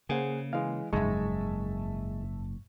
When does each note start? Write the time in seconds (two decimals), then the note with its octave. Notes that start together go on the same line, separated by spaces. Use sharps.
0.09 C#3 A#3 G#4 C5 F#5
0.53 E3 G#3 F5
0.93 F#1 F2 G#2 G#3 E5 A5 C#6